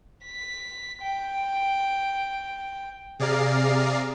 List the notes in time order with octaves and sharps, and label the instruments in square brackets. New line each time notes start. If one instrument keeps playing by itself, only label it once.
[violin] B6
G5
[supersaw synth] C3 G#4 D5 F5 A#5 C7